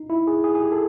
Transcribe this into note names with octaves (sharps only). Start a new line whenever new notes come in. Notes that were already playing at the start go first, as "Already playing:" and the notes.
Already playing: D#4
E4
G#4
G#4
G#4
G4
A4